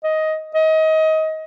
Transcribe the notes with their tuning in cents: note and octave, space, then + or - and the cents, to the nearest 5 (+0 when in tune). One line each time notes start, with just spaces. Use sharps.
D#5 +10
D#5 +25